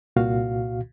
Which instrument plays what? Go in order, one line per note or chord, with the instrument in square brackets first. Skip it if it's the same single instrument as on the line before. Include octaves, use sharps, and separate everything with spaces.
[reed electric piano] C2 A#2 F#4 F5